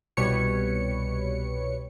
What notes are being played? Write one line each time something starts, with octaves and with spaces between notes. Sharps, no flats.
C2 B2 G3 B4 C#5 C#7